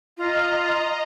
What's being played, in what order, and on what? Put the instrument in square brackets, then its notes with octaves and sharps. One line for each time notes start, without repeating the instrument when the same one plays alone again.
[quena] F4 [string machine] D#5 A#5